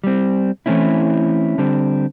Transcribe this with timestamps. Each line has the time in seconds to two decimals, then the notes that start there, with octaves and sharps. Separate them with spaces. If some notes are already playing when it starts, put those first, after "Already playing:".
0.04 G3 C4
0.66 E3 A3 C4 C#4 E4
1.58 D3 G3 C4